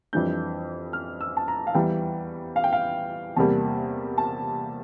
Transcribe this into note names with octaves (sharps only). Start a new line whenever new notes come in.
F2 E3 G3 D4 G6
F6
E6
A5
A#5
F5
E2 E3 G3 G5
F5
G5
F5
E2 C3 G3 A#3 A5
A5